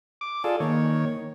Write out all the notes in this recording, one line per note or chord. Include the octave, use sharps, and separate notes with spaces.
D6
F4 G#4 A4 D5
D#3 A#3 C#5